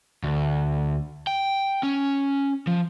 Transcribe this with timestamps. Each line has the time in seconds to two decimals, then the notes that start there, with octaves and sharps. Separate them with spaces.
0.23 D2
1.27 G5
1.83 C#4
2.67 F3